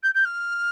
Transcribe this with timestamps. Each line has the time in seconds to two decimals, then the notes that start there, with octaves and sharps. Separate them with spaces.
0.03 G6
0.15 G6
0.25 F6